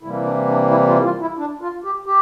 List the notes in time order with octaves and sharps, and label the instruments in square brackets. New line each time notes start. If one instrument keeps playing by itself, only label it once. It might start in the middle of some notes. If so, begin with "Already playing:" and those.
[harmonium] C3 E3 G3 A#3 E4
D4
D4
E4
F4
F4
E4
D4
F4
G4
G4